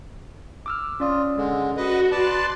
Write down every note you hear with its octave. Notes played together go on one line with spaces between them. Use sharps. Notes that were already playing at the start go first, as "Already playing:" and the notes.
D6 E6 F6
C#4 F4 D5 D#6
D3 G#3
F#4 B4 D#5
B4 D5 A5 C6 F#6 A6